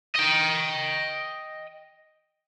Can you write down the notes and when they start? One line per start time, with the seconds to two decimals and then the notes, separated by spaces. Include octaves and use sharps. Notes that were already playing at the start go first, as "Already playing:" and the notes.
0.15 D#5 G5